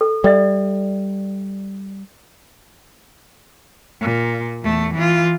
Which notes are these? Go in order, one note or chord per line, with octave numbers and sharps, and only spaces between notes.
A4
G3 A4 D5 E5
A#2
E2 A3
E3 F4